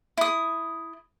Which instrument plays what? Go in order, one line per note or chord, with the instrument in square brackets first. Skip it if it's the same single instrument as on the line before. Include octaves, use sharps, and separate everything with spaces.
[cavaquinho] E4 D#6